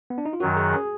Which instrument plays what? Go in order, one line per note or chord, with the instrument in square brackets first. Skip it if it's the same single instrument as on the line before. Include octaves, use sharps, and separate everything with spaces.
[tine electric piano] B3
D4
D#4
F4
[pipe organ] F#2 D#3 F#3 [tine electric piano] F#4
[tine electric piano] G#4
G#4